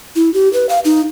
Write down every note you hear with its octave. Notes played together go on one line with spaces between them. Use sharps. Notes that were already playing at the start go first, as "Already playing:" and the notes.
E4
G4
B4
F5
D#4